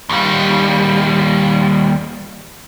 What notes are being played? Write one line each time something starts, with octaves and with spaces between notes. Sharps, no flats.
D#2 G3